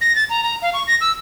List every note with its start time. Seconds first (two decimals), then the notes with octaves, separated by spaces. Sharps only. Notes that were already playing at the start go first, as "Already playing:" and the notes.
0.01 A#6
0.15 A6
0.30 A#5
0.44 A#5
0.62 F5
0.74 C#6
0.88 A#6
1.01 E6